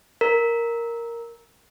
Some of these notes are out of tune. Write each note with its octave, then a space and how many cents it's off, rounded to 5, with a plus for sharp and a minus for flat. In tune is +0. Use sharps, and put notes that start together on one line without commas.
A#4 +0